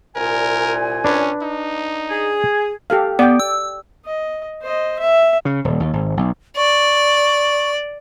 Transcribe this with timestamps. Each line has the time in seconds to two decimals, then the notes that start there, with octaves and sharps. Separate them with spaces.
0.15 C2 A#2 A#4 G#5
1.05 C#4 D4 B4
1.41 D#4
2.09 G#4
2.90 G4 A4 F5
3.19 B3 D5 G5
3.40 E6
4.06 D#5
4.62 C5 D#5
4.99 E5
5.45 C#3
5.65 D#1
5.80 D#2
5.93 G#1
6.17 B1
6.57 D5 C#6